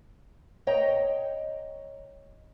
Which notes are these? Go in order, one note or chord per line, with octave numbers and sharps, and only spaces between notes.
C#5 D#5 G5 A#5